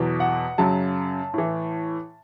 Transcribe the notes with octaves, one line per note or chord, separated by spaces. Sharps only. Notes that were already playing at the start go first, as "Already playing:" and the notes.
Already playing: E2 B2 F#3
F#5
F#2 C#3 F#3 A5
A2 E3